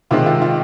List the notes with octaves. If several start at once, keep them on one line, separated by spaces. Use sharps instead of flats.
C3 D#3 G#3 C4 F4
F4
F4